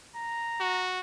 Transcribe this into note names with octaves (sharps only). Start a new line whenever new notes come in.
A#5
F#4